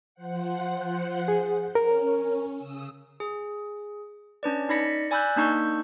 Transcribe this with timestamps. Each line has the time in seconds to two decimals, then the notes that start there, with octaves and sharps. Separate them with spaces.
0.15 F3 C5 F#5
1.28 G#4
1.75 C#4 A#4
2.55 C#3 D#6 E6
3.20 G#4
4.43 C#4 D4 B4 D5
4.69 D#4 D5 B5 A#6 B6 C#7
5.11 D5 G#5 B5 E6 F#6 G6
5.36 A#3 D4 D#4 C#6 E6 G6